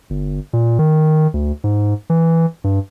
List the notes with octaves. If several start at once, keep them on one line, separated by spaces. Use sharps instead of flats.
G1
A#2
D#3
D2
G#2
E3
G2